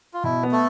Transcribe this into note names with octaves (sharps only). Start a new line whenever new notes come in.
F4
B2 E4
B3
A3 A4